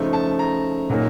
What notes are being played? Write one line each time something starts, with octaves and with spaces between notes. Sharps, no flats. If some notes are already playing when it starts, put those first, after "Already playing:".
Already playing: C#3 F3 A3 D#4
A5
A#5
A#2 F#3 A#3 D#4